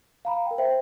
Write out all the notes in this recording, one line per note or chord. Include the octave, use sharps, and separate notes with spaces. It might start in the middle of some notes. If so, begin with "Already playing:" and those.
F5 A#5 B5
A#4 G5
C5 E5 G5